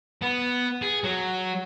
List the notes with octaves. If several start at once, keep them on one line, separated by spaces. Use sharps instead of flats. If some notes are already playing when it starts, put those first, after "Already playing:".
B3
G#4
F#3